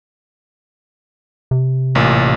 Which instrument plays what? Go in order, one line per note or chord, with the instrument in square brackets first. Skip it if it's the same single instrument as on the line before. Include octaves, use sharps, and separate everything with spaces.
[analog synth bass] C3
[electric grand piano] A1 A#2